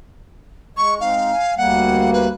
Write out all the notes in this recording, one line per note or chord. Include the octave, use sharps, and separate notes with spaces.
G#3 C#6
G#3 C4 D#4 F5
G#5
D2 G3 A#3 F#5
B4